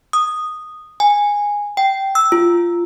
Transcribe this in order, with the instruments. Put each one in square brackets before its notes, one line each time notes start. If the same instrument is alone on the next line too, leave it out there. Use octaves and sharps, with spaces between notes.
[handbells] D#6
G#5
G5
E6
F4